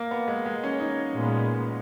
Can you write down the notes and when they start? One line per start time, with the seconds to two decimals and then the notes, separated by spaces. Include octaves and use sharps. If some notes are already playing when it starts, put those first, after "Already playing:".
Already playing: A#3
0.11 B3
0.28 G#3
0.46 G#3
0.63 C#4
0.80 D#4
1.15 A#2 G#3 B3